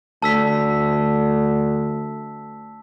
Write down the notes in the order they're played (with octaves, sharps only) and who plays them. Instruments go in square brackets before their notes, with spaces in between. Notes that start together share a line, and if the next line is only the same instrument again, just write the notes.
[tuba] D2 [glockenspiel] A5 E6 B6